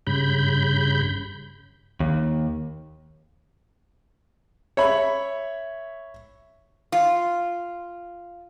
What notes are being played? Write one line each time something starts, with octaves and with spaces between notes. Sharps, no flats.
G2 C#3 B5 G6
D#2
C#5 E5 B5
F4